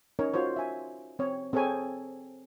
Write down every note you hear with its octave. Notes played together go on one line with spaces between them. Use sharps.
C#4 D#4 A#4 C#5
F4 F#4 C5 C#5
E5 G#5
C4 C#5
C4 G#4 A4 C#5 G#5